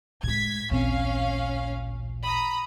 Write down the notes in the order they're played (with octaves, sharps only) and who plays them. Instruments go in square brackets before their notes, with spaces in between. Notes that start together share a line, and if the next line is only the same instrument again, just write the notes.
[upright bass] A2 G#3 [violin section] G#6 B6
[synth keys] A1 D2 A#2 [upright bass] C4 [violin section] C#4 F5
[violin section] A#5 B5 D#6